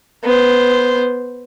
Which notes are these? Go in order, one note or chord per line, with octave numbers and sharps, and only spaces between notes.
B3 C5